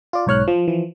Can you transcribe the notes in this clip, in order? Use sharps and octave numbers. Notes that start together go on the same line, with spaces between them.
F4 D5
B1 G#2 C#5 F6 F#6
F3
E3 F3